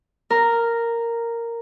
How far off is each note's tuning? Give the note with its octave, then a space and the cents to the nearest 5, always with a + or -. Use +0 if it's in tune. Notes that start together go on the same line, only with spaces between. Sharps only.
A#4 -5